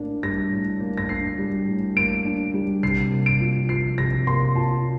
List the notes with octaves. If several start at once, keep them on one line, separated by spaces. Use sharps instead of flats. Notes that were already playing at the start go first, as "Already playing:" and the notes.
Already playing: A2 A#3 D4
G3 A#6
A2
A#3
A#6
D4 C7
G3
A2
A#3 D7
D4
G3
C3 C7
A#3
D7
F4
F3 C7
C3 A#6
A#3 C6
F4 A5